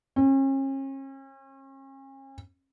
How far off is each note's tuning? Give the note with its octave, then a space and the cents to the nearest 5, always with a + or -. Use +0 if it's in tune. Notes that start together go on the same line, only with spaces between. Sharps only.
C#4 -40